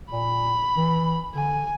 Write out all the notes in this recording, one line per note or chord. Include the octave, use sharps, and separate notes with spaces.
A#2 B5
E3
D3 G#5